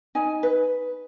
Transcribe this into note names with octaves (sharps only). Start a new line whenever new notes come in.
D#4 G#5
B4